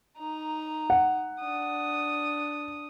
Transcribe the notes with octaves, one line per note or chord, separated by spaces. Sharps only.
D#4 A#5
F#5
D4 D#6